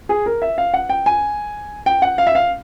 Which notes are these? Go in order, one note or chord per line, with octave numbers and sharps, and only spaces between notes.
G#4
A#4
E5
F5
F#5
G5
G#5
G5
F#5
F5
E5
F5